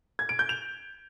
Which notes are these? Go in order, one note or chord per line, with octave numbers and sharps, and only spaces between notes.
G#6
D7
G6
F7